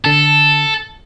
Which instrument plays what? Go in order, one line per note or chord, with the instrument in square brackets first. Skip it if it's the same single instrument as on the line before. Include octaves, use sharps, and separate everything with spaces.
[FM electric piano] D3 A5 [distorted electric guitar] A4